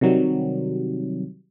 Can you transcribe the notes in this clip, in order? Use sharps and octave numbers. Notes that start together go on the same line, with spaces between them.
C3 D#3 F#3 G3